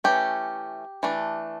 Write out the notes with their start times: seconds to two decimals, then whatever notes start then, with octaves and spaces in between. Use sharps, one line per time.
0.04 E3 A3 C#4 G4
1.03 E3 A3 D4